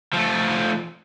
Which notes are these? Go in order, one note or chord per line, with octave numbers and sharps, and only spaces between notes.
F3 A3